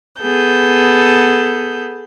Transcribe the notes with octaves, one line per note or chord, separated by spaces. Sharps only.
B3 G#4 A4 G6